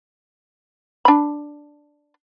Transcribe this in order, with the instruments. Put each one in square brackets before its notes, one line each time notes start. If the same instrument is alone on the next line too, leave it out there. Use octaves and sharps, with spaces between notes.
[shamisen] D4 B5